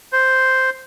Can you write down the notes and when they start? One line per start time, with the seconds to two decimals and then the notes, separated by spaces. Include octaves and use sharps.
0.13 C5